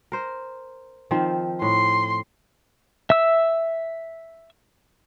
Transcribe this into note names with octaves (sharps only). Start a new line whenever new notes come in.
A#4 C5
D#3 F3 C4
A2 C6
E5 E6